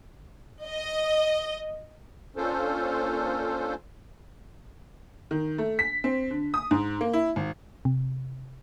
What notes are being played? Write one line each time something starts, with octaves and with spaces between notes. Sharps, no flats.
D#5
A#3 C#4 D4 F4 A4 C5
D#3
A3
B6
C4
D3
D#6
G#2
A#3
E4
G#1
C3